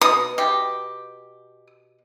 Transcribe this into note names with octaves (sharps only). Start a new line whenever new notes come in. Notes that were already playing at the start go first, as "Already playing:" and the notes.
B2 D#6
B2 G4